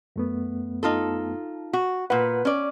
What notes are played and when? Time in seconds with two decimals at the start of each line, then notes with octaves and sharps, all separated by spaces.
0.16 F#2 A3 B3
0.83 D#4 F4 A4
1.73 F#4
2.10 A#2 B4 F#5
2.45 C#4 D5